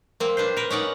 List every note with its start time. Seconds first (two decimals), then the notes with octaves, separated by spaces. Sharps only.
0.20 A#3 C4
0.37 D4 B4 C5
0.57 A#4 B4
0.70 C#4 D#4 D5 F#5